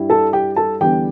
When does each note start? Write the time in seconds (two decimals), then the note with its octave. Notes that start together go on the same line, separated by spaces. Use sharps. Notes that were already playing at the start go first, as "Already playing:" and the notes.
Already playing: G2 G3 E4
0.10 A4 A5
0.33 G4 G5
0.56 A4 A5
0.80 E2 D3 G3 B3 G4 G5